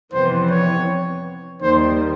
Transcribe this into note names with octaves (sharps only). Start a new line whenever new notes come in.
F2 C3 E3 G3 B3 C5
C#5
D#2 D#3 G3 C5